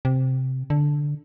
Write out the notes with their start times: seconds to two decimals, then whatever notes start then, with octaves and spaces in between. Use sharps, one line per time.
0.05 C3
0.70 D3